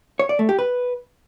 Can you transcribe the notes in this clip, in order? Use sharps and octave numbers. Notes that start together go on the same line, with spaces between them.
C#5
D5
A3
G4
B4